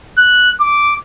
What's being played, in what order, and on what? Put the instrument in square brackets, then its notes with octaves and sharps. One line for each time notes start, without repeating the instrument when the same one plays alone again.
[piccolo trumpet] F#6
D6